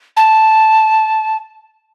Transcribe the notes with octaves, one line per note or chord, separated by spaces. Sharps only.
A5